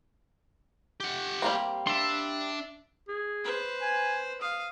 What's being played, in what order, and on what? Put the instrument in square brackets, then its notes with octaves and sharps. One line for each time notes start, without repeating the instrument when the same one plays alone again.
[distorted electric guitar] G4 F#5
[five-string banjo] G3 A#3 C4
[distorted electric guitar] D4 [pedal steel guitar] E5 C6
[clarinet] G#4
[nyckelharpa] B4 C5
[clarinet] G#5
[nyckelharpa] F5 [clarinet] D#6